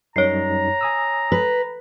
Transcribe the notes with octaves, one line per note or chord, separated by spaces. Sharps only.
F#2 G3 D#4 C#5 A#5 C7
G#5 D#6 E6
B4